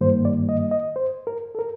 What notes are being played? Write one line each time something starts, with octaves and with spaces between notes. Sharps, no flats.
G2 D#3 G3 A#3 C5
D5
D#5
D#5
C5
A#4
A4
A#4